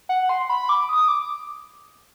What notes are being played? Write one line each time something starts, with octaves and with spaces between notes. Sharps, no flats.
F#5
C6
B5
D6
D#6
D6